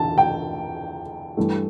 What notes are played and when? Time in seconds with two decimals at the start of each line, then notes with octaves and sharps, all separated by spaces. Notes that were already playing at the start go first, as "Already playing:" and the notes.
Already playing: E2 D3 A5
0.18 G5
1.37 G2 E3 A3